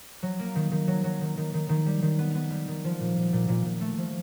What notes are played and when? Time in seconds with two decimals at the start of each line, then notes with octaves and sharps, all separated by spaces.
0.23 F#3
0.39 A#3
0.55 D#3
0.72 D#3
0.87 F#3
1.04 F#3
1.21 D#3
1.38 D#3
1.54 D#3
1.69 D#3
1.86 G3
2.02 D#3
2.19 B3
2.35 B3
2.51 G3
2.68 D#3
2.84 F3
3.00 A#2
3.16 A#2
3.33 A#2
3.49 A#2
3.65 A#2
3.81 A3
3.98 F3